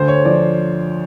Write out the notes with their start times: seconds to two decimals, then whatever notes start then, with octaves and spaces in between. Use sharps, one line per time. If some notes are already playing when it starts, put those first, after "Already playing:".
Already playing: D2 C5
0.08 C#5
0.25 F3 D5